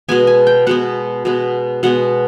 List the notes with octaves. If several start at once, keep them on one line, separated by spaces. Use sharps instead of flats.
B2 G#3 B3 G#5
G#5
G5
B2 G#3 B3 F#5
B2 G#3 B3
B2 G#3 B3 F#5